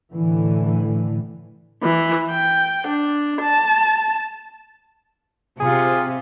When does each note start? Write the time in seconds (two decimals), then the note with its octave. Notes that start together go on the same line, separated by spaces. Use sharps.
0.12 A2 D3 E3
1.83 E3
2.31 G5
2.87 D4
3.42 A5
5.60 C3 F4 G#4